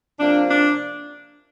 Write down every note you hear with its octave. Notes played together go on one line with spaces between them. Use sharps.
C3 F3 A#3 D4
D4